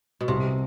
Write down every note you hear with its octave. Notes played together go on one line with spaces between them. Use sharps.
B2
C2 C3